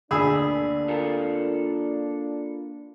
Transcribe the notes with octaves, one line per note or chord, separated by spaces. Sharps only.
D2 A#3 D4 G#4 D5 B5 E6
F4 A4 A#4